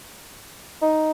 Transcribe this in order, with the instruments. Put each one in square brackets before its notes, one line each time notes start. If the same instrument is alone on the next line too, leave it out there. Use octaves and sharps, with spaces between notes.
[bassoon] D#4